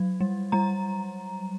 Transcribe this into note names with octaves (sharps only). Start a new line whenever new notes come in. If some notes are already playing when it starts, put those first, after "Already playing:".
Already playing: F#3
G3
G3 A#5